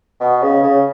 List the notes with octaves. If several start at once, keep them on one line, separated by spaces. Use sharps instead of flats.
B2
C#3
C#3